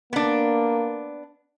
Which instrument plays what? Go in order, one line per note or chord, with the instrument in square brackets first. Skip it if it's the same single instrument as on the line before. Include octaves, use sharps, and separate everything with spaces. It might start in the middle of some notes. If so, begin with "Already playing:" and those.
[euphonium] A#3 [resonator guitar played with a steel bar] B3 D4